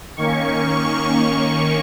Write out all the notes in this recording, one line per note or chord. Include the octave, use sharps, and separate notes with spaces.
D#3 A#3 C#4 C#6
D#3 A#3 C#4